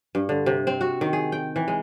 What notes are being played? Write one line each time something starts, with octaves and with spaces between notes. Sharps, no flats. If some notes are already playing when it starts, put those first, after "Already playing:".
G2
D3
C3
C4
F#4
D#3
G#4
G5
E3
G#3